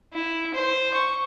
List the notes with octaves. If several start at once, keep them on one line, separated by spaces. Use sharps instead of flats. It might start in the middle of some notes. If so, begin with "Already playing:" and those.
E4
C5
C#6